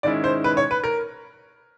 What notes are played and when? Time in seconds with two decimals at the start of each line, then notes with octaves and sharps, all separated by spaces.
0.03 G#2 D#3 G#3 C#4 E4 D5
0.24 C5
0.44 B4
0.57 C#5
0.71 B4
0.84 A#4